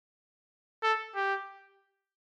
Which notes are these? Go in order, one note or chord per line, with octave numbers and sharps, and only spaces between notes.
A4
G4